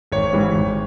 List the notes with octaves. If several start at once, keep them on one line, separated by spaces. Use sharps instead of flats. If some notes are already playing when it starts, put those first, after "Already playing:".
G#1 C#5
G#2 E3 G3
G#1